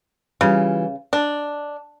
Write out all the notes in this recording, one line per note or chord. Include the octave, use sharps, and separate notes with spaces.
C#3 E3 G3 F4
D4 D#5